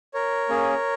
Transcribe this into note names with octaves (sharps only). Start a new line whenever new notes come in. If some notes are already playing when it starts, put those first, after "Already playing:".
A#4 C#5
A#3 C#4 G#4